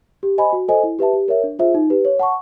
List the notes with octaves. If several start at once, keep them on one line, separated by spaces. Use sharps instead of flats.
G4
C5 D#5 G#5 B5
F#4
A4 C5 D#5 G#5
E4
G4 B4 E5 A5
G4
A#4 C#5 E5
D4
F4 G#4 C5 E5
D#4
G4 B4
C#5
F#5 A5 C#6